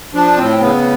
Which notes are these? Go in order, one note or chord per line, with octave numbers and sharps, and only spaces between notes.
F3 D4
A2 C4
C#3 B3